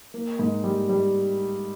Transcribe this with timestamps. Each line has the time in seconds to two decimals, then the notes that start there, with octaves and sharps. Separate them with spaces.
0.14 A#3
0.39 G#2
0.64 G3
0.89 G3